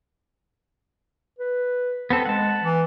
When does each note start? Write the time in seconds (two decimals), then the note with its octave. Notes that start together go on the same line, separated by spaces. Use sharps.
1.39 B4
2.10 B3 C4 A4
2.26 G#3 F#5 A5
2.61 E3